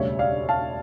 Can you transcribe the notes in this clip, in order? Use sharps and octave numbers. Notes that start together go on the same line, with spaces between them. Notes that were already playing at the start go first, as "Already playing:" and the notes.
Already playing: E1 D2 C#3 G3 C#5 E5
D5 F5
F5 A5